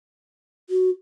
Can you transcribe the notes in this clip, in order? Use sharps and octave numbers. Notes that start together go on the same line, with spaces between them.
F#4